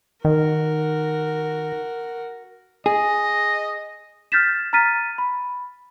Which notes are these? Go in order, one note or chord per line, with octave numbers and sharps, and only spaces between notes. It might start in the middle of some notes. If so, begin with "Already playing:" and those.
D#3 F#4 A#4
G#4 D#5
F6 G6 A6 B6 E7
A#5 F6 A6 B6 D#7
B5